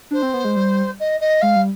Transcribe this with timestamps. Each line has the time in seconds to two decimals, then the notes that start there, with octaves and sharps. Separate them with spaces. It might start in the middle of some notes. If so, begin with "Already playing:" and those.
0.11 D4 C5
0.23 C4
0.34 B3
0.45 G#3
0.56 G3
1.00 D#5
1.21 D#5
1.42 G#3 F5
1.56 G3